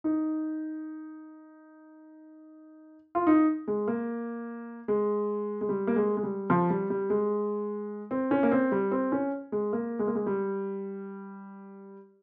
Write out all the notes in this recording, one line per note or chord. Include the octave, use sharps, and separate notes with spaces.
D#4
F4
D#4
G#3
A#3
G#3
G#3
G3
A#3
G#3
G#3
G3
F3
G3
G3
G#3
C4
C#4
A#3
C4
G3
C4
C#4
G#3
A#3
G#3
A#3
G#3
G3